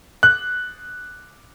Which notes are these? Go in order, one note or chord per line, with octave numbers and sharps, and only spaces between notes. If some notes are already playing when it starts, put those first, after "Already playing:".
F#6